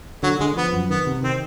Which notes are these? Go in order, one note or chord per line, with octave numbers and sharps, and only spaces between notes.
D3 F#3
D3 G#3
F3 B3
F#2
D#3 B3
C3
D#3 C4